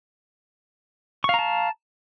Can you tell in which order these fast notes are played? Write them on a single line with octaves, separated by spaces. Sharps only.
C#6 F5 A#5 A5